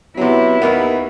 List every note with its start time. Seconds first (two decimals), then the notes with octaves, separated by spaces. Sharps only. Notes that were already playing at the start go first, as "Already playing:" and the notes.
0.17 C3 F#3 B3 E4
0.62 D#2 B3 A#4